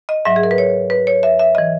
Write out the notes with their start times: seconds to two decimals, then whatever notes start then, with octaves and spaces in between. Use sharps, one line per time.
0.09 D#5
0.25 G#2 F#3 E5
0.36 G#4
0.43 A#4
0.51 B4
0.58 C#5
0.90 B4
1.07 C#5
1.23 E5
1.39 E5
1.55 D#5
1.58 E3